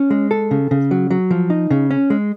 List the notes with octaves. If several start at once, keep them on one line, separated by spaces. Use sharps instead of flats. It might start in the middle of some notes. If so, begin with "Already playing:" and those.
Already playing: C#4
G#3
A4
C#3
C#3
F#3
F#3
F3
D#4
C#3
C#4
G#3